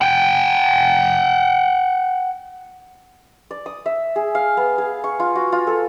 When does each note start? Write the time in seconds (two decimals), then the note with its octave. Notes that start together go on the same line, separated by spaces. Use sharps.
0.01 F#5 G5
3.51 D5
3.66 D#6
3.86 E5
4.16 G#4
4.35 F5
4.57 B3
4.78 G#4
5.04 C#6
5.20 F4
5.35 F#4
5.52 F4
5.67 A4